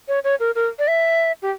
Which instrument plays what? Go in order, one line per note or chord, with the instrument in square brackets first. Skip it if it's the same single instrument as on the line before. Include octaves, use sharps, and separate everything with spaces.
[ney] C#5
C#5
A#4
A#4
D5
E5
G4